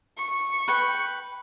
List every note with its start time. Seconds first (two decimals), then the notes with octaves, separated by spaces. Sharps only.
0.18 C#6
0.68 B4 G5